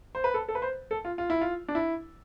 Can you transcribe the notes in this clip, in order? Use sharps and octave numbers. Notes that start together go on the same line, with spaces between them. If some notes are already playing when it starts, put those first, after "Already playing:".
C5
B4
A4
A4
B4
C5
A4
F4
F4
E4
F4
D4
E4